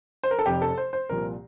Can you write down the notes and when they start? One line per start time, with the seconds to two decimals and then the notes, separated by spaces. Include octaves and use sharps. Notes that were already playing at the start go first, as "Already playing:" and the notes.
0.23 C5
0.31 A#4
0.39 A4
0.46 F1 F2 C3 G4
0.62 A4
0.78 C5
0.93 C5
1.09 C2 A#2 F3 A#4